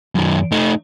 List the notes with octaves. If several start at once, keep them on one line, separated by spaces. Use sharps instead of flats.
F#2 D#3
A3 D#4